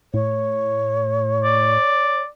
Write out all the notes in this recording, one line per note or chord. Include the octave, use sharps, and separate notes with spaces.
A2 C#5
D5